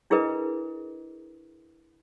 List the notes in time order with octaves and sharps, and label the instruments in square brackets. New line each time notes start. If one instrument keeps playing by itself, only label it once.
[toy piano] D4 E4 G#4 A#4 B4 D#5